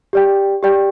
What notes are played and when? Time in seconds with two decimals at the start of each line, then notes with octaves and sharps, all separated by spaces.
0.13 G4 D5 G5
0.63 G4 D5 G5